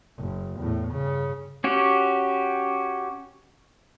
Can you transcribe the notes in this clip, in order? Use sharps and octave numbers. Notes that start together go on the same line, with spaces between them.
F#1
E2 A2
G2 C#3
C#4 F#4 G4